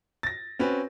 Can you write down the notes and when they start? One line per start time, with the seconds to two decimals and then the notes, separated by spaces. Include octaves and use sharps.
0.23 A6 A#6
0.59 C4 C#4 F#4 B4